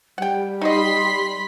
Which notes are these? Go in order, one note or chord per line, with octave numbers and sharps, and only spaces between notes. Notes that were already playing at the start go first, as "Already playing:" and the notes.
G3 F#5 G5
D#4 F#4 D#5 B5 C6 B6